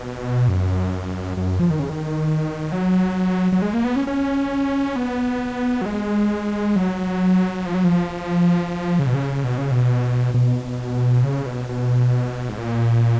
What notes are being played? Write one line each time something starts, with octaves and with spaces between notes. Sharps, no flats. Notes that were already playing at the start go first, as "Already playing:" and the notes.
Already playing: B2
F#2
F#2
F3
D#3
C#3
D#3
F#3
F#3
G#3
A#3
B3
C#4
C#4
B3
F#3
G#3
F#3
F3
F#3
F3
C#3
B2
C#3
B2
C#3
B2
B2
C#3
B2
B2
G#2
A#2